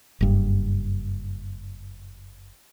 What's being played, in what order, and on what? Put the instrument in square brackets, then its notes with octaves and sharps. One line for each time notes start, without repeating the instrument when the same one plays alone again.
[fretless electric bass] F#1 G2